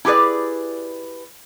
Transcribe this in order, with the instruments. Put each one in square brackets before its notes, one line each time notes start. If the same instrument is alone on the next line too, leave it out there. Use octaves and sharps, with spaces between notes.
[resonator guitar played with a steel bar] E4 G4 G#4 B4 D5